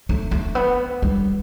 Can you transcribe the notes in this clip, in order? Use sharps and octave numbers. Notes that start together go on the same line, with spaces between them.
A3
A3
B3
G3